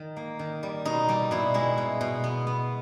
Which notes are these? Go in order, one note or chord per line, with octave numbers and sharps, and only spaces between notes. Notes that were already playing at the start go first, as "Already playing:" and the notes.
Already playing: D#3
A#3
D#3
G3
B2 D#4
G3 G4
B2 E4
G#3 E4
B2
B2
B3
B3